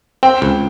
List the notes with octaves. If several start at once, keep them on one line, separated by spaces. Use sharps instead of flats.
C4 G5
C#2